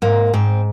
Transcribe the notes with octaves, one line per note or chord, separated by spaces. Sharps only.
G#2 A#3
G#2 C4